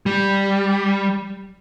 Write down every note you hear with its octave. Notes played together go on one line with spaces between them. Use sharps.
G3